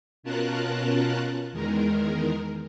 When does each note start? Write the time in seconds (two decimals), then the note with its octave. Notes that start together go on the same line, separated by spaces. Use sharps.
0.23 B2 C#4 F4 A#4 A5 F#6
1.52 E2 D#3 G#3 A#4